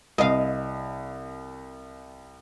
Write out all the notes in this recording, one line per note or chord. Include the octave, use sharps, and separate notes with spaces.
C2 D#5 F5